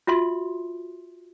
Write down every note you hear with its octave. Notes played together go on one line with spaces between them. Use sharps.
F4 F#4 E5 C6